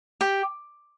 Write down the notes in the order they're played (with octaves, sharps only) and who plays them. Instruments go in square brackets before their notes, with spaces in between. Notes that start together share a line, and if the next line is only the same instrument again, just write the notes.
[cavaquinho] G4